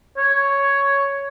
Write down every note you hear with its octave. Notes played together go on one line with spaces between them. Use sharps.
C#5